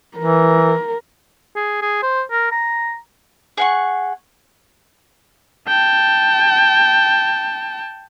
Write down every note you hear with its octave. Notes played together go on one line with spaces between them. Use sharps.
E3 A#4
G#4
G#4
C5
A#4
A#5
G#4 F#5 C#6
G5 A5